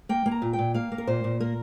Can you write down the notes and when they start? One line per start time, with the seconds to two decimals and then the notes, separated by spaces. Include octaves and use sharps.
0.09 A#3 G5
0.26 A#3
0.31 A#5
0.42 A#2
0.53 G5
0.59 A#2
0.74 A#3 F5
0.92 A#3
0.98 A#4
1.07 A#2 C5
1.24 A#2
1.40 A#3 A#4